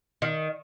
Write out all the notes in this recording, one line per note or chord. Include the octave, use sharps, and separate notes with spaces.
D#3